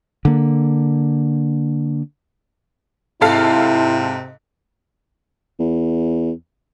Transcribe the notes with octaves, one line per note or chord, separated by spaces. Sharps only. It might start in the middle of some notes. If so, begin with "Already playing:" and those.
D3 A#3
G#2 C3 E4 A4 F5
E2